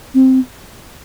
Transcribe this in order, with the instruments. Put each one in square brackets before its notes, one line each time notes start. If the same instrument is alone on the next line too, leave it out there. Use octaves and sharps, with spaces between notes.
[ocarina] C4